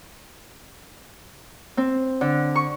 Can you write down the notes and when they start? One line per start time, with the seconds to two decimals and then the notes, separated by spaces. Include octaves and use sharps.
1.77 C4
2.21 D3
2.55 C#6